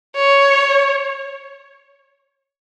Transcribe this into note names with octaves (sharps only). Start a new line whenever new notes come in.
C#5